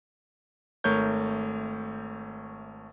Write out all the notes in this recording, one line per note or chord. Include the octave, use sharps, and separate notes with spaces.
G#1 A3 A#4 C#5 G6